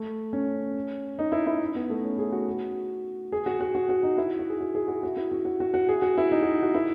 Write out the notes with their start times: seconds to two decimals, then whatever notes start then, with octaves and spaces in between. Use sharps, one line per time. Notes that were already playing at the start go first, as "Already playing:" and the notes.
Already playing: A3
0.33 C#4
1.19 D#4
1.32 E4
1.47 E4
1.75 B3
1.90 A3
2.03 C#4
2.19 G#4
2.32 F#4
3.32 G#4
3.46 F#4
3.61 F#4
3.75 F#4
3.89 F#4
4.03 D#4
4.18 E4
4.39 F#4
4.50 G#4
4.61 F#4
4.75 G#4
4.88 F#4
5.03 F#4
5.17 E4
5.32 F#4
5.45 F#4
5.60 F#4
5.74 F#4
5.89 G#4
6.02 F#4
6.18 E4
6.32 D#4
6.42 F#4
6.63 F#4
6.74 E4